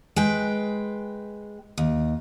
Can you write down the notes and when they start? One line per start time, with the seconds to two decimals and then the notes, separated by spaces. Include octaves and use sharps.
0.16 G#3 B4 G5
1.78 D#2